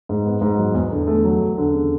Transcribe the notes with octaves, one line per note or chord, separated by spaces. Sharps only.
G#2
B3
G#2
F#3
E2
D3
A3
F#3
E2
D3
C#3